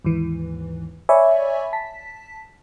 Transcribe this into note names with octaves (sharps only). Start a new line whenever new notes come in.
D#2 G#2 E3
C#5 D5 E5 G#5 B5 C#6
A5 B6